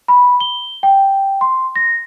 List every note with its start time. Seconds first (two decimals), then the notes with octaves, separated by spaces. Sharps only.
0.08 B5
0.40 G7
0.83 G5
1.41 C6
1.76 A#6